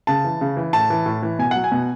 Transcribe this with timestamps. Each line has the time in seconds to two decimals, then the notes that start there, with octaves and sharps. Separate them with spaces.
0.07 C#3 A5
0.24 E3
0.41 C#3
0.57 E3
0.73 A2 A5
0.90 E3
1.06 A2
1.23 E3
1.39 B2 G#5
1.51 F#3 F#5
1.64 G#5
1.72 B2